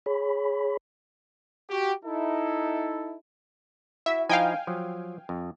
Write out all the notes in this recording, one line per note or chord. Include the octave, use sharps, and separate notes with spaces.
G#4 C#5 B5
F#4 G4
D#4 E4 A4
E4 F#4 E5
F3 D#4 E4 F5 G5 G#5
F3 F#3
F2